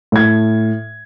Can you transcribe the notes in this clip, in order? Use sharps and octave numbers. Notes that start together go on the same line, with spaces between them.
A2 G#6